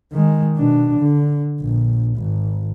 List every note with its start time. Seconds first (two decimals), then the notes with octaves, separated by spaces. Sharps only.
0.13 D#3 G#3
0.57 B2 D4
1.00 D3
1.61 A#1
2.18 G#1